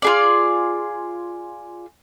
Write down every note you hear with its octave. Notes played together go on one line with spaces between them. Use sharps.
F4 G#4 D5